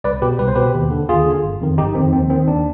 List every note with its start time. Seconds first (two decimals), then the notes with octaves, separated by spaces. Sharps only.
0.04 C2 B4 D5
0.22 B2 G4 B4
0.39 C2 B4
0.48 C5
0.56 B2 G4 B4
0.74 D#2
0.91 D3
1.09 D#2 F4 G#4
1.26 D3
1.43 G1
1.61 F2 D#3
1.78 G1 D#4 G4
1.95 F2 D#3 C4
2.12 D#2 C4
2.30 D#3 C4
2.47 D#2 D4